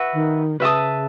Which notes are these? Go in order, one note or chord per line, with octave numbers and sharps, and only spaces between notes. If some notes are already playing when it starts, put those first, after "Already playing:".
Already playing: F#4 B4 E5
D#3
C#3 B4 E5 A5 D#6